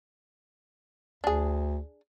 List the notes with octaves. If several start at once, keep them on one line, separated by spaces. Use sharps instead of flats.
D2 D4 G#4